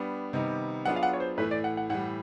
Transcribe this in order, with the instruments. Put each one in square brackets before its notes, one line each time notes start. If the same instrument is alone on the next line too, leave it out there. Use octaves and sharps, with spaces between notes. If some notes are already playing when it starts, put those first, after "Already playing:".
Already playing: [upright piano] G3 B3 D4
C3 D#3 G3 B3 D#4
[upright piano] F#3 B3 D4 F4 G#4 [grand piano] F#5
[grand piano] F5
F#5
C#5
C5
[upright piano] A2 E3 A3 [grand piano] B4
[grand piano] D5
F#5
F#5
[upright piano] A2 E3 G3 [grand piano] F#5